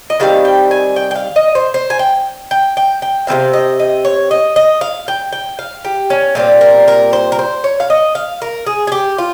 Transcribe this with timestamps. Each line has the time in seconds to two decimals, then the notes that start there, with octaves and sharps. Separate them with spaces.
0.10 D#5
0.20 D#3 G3 C4 F5
0.45 G5
0.71 G#5
0.96 G5
1.11 G5
1.15 F5
1.36 D#5
1.55 C5
1.74 C5
1.90 G#5
1.99 G5
2.51 G5
2.77 G5
3.02 G5
3.27 C3 G3 C4 F5
3.53 D#5
3.80 D#5
4.05 C#5
4.31 D#5
4.56 D#5
4.81 F5
5.08 G5
5.32 G5
5.59 F5
5.85 G4
6.10 C#4
6.35 A#2 G3 C4 F4
6.61 A#4
6.88 A#4
7.13 C5
7.32 A#4
7.39 C5
7.64 C#5
7.80 F5
7.90 D#5
8.15 F5
8.42 A#4
8.66 G#4
8.87 G#4
8.92 G4
9.18 F4